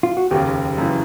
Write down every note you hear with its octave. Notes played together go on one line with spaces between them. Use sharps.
F4
F#4
F1 D#2 C#3 G4
F#2 C#3 E3